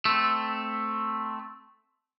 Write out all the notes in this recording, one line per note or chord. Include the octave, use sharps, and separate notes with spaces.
A3 C4